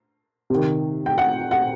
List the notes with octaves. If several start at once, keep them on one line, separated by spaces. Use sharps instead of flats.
C3 D#3
G5
F#5
F#5